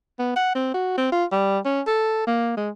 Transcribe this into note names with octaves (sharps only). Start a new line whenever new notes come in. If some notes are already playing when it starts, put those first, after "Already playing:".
B3
F#5
C4
F#4
C4
F4
G3
C#4
A4
A#3
G#3